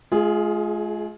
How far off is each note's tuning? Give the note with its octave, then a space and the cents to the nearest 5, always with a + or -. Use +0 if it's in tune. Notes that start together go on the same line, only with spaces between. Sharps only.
G#3 +40 F4 +0 G#4 +0